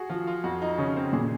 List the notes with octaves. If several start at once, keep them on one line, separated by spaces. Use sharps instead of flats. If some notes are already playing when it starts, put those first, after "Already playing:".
Already playing: F#4 G#4
F3 F4
F4
F2 F#4
D#4
C#3 C#4
C4
A#2 G#4